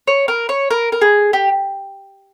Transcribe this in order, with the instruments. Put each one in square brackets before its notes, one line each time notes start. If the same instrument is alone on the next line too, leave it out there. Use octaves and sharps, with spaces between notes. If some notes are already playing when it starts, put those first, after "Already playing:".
[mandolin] C#5
A#4
C#5
A#4
A#4
G#4
G4